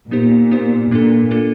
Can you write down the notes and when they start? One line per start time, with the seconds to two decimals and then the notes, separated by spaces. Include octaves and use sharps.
0.11 A#2 B3 D#4 G4 C5
0.51 B3 D#4 G4 C5
0.91 A#2 A#3 D4 F4 A4
1.31 A#3 D4 F4 A4